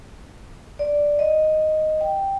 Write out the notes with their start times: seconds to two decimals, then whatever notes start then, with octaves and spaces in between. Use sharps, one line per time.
0.79 D5
1.19 D#5
2.01 G5